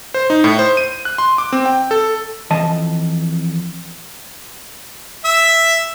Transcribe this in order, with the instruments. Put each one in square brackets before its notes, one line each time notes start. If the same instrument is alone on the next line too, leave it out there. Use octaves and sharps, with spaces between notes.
[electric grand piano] C5
D#4
A2
C5
D#7
F#6
C6
D6
C4
G5
A4
[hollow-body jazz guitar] F2 E3 D#5 A5
[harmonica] E5 E6